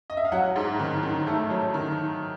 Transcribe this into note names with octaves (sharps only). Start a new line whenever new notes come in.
D#5
E5
F5
F#3 F#5
G#2
D#3
D#3
A3
F#3
D#3